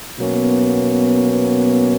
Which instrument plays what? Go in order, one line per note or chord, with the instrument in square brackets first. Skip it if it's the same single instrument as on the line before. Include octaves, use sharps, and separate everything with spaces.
[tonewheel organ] B2 F#3 A#3 C#4 [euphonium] B3